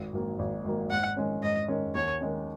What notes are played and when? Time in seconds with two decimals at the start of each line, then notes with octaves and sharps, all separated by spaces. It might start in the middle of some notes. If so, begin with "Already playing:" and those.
Already playing: G#1
0.13 G#2 D#3 F#3 A#3
0.39 G#1
0.65 G#2 D#3 F#3 A#3
0.91 G#2 F#5
1.17 D#3 G#3 C#4
1.43 G#2 D#5
1.68 D#3 G#3 C#4
1.95 D#2 C#5
2.21 D#3 G#3 C#4